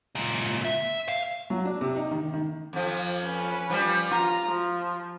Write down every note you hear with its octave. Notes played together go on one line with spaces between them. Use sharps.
C#2 A#2
E5
F5
F#3
D4
C3
D#4
D#3
D#3
F2 F3
C#4 B4
F3 G3
F4 A#5
F3